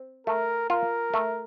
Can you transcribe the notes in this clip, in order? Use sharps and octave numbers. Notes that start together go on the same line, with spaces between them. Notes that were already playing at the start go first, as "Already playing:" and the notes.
Already playing: C4
A3 A#4
F4 A#4
A3